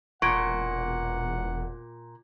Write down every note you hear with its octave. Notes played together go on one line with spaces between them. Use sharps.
E1 A#2 F#5 C#6 G#6 D7